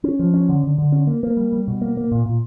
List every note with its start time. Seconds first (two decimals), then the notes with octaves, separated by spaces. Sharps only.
0.04 C#4
0.19 F3
0.34 C#4
0.49 D3
0.64 D3
0.78 D3
0.92 C#4
1.07 A#3
1.23 A#3
1.37 G3
1.53 G3
1.68 B2
1.81 A#3
1.97 A#3
2.12 A#2
2.26 A#2